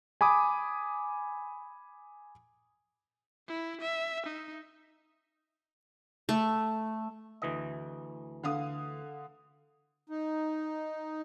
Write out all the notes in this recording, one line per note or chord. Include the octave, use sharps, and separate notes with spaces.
G#5 B5 D6 D#6
E4
E5
D#4
A3
D2 E3 D#5
D3 F5 D#6
D#4